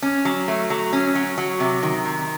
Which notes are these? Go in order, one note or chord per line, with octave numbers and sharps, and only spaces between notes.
C#4
F#3
A3
F#3
C#4
F#3
F#3
C3
D#3
C3